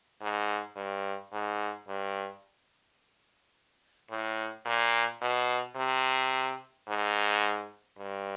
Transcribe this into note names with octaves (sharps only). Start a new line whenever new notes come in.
G#2
G2
G#2
G2
A2
A#2
B2
C3
G#2
G2